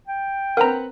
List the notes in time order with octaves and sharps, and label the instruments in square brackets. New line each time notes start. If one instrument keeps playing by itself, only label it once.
[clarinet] G5
[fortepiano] C4 B4 F#5 [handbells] A#4 A#5